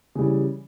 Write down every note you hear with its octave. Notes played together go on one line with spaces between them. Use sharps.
C#3 E3 G3